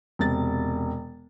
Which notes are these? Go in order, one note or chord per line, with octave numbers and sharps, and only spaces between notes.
E1 C3 A6